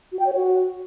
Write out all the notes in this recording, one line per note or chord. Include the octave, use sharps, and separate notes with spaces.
F#4
G5
C#5
F#4